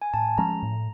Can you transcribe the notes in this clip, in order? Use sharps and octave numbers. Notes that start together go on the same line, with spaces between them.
G#5
A2 A5
F3 G#3 C#4 A#5
A2